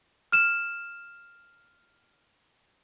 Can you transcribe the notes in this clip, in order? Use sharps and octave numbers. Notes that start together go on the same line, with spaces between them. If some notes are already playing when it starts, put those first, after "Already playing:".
F6 E7